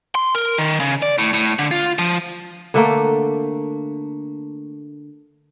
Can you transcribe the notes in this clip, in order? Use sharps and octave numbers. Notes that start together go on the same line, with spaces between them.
C6
A#4
D#3
C#3
D5
A2
A2
D3
F4
F3
D3 A3 A#3